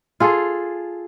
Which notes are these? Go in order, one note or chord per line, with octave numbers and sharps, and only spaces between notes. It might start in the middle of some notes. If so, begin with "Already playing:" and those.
F4 G#4 A4